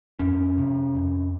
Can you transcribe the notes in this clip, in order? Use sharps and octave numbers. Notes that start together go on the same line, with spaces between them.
F2 C#4
C3
F2